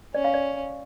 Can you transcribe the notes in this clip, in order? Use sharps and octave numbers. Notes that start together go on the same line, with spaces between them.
C#4 D5
F5
D5